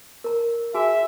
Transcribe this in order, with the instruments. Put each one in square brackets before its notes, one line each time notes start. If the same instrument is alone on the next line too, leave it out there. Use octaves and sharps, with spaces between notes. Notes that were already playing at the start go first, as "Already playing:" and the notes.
[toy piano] A#4 A#5
[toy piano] F#4 G#4 G#5 [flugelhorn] E5